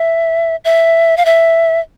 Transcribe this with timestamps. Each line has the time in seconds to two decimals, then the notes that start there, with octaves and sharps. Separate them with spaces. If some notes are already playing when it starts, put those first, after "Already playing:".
Already playing: E5
0.65 E5
1.17 F5
1.25 E5